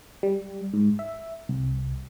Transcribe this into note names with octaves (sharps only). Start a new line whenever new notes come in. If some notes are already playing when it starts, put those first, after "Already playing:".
G3
G#2
E5
C2